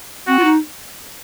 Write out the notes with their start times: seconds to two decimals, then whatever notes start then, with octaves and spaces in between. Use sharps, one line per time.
0.27 C4 F#4
0.39 F4
0.44 D#4